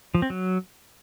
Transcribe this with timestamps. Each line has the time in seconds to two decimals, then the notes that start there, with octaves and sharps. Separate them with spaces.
0.15 F3
0.22 C4
0.30 F#3